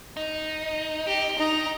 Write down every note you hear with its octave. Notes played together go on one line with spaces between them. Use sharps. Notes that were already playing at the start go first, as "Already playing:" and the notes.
D#4
G4
D#4 A#5